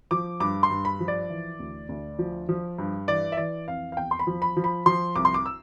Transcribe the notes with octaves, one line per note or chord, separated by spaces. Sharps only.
F3 D6
G2 D6
C6
G2
B5
F3
D5
E3
D2
D2
F3
F3
G2
E3 D5
E5
E3 D5
F2 F5
F5
E2 G5
C6
B5
F3
B5
F3
B5
F3 C6
C2 D6
C6
D6
E6